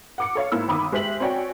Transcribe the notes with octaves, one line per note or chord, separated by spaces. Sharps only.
F#5 D6 C#7
A4 C#5 F5
G#2 A#3 E4 E6
G1 D#3 B5 D6 D#6
G#3 G4 C5 E5 B6 F#7
C4 F#4 C#5 D5 G5 G#5